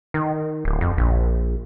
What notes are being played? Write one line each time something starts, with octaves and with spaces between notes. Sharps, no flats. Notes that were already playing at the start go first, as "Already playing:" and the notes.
D#3
D1
F2
A#1